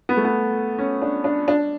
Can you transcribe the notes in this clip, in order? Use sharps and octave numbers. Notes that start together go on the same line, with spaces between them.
B3
A3
B3
C#4
D4
D4
D4